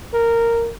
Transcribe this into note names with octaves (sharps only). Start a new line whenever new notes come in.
A#4